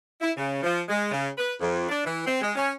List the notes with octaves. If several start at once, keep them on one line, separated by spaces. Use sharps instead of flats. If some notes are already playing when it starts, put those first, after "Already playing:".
E4
C#3
F3
G#3
C#3
B4
F2
D4
E3
C4
G#3
C#4